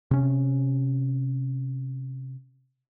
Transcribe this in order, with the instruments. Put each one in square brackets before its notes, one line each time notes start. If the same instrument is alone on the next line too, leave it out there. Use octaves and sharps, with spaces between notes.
[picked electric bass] C3 C#4